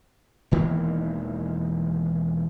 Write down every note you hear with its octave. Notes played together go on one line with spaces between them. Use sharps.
E1 D#3 E3 A#3